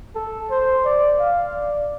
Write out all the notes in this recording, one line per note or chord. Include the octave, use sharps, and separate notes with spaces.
A4
C5
D5
F5
D5